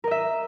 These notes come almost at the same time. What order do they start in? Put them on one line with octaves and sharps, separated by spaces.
A#4 D#5 E5